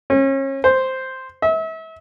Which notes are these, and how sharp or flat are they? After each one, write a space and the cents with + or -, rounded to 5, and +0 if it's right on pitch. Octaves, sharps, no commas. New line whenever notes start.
C#4 -35
C5 +0
E5 -35